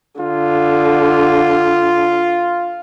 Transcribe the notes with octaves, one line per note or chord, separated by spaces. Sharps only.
D3 F4